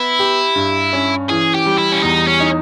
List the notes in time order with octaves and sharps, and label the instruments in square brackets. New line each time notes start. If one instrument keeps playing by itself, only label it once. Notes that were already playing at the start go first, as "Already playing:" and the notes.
Already playing: [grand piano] B3 [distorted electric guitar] E4
[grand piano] G4
G2
C#4
[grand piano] E3 [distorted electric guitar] G#4
[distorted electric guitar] G4
[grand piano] G3
[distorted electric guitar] E4
C#4
[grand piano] E2 [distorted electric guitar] D#4
[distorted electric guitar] C#4
[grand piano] D#4